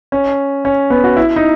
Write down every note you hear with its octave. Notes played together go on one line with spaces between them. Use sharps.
C#4
C#4
B3
F#4
E4
D#4